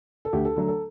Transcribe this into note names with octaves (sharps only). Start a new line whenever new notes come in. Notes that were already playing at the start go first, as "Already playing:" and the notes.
A4
D2 G4
A4
D3 F#3 A3
A4